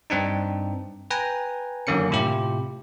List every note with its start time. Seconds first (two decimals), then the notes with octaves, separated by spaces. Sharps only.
0.10 G2 C4 D4 D#4
1.11 B4 G5 G#5 A#5
1.87 F#2 D3 D#3 A#3 C#4 C#7
2.10 A2 C3 E4 F4 G4